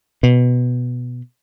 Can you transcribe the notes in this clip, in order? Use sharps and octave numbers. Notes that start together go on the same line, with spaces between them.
B2